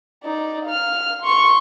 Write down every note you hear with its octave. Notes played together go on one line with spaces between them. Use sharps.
D#4 D5
F5 F6
C6 C#6